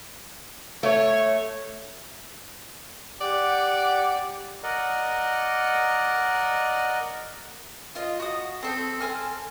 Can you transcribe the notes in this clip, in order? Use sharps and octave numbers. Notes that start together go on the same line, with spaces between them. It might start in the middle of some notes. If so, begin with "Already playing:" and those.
A3 C#5
G4 D5 F#5
A#4 D5 D#5 F#5
F4 D#5
F#4 D#6
C4 A4 C5
C4 A4 G#5 F6